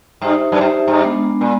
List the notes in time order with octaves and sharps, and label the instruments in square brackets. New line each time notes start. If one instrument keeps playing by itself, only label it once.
[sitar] G2 [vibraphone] D#4 G4 C5 E5
[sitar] F#2
[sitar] G2 [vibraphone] D#4 G4 C5 E5
[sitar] G2
[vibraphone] G#3 B3 D4
[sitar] A#2 [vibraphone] G#3 B3